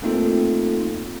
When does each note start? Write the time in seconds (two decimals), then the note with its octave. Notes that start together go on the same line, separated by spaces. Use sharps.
0.02 A3 A#3 C4 D#4 F4 A4